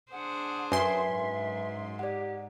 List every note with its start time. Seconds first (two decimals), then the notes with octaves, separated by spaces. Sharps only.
0.12 D4 G#4 C5 F#5
0.72 F#2 B4 E5 G#5 C6
1.11 G#2
1.99 G4 D5 F#5